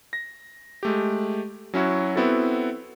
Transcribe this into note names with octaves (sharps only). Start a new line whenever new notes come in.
A#6
G#3 A3 G4
F#3 C#4 E4 F#4
B3 C4 E4 F#4 A4